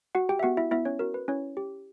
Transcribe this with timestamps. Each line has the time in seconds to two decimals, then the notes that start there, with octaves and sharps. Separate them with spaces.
0.15 F#4 F#5
0.29 G4 G5
0.39 E5
0.43 B3 F#4 F#5
0.57 E4 E5
0.71 B3 E4 E5
0.85 C#4 C#5
0.99 F#4 A#4
1.14 B4
1.28 C#4 E4 C#5
1.57 G4